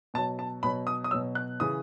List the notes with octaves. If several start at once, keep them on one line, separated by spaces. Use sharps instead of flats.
B2 F#3 A5
A5
B2 F#3 B5
D#6
D#6
B2 F#3 E6
F#6
C#3 E3 D#6